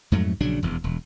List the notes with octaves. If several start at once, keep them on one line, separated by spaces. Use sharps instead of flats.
F2 G#2 F#3 A3
A#1 C#3 F#3 D4
E1 E2
E1